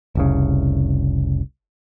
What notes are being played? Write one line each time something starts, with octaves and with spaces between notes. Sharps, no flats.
F1 C2 C#3